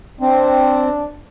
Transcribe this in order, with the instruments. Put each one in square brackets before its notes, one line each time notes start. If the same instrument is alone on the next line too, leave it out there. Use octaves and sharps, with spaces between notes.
[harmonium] C4 [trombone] D4